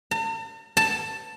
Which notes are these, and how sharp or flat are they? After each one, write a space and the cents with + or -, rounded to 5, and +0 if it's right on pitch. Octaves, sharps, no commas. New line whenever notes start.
A5 +45
A5 +10